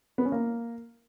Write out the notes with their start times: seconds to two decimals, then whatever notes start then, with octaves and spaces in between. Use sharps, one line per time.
0.18 B3
0.25 C#4
0.32 A#3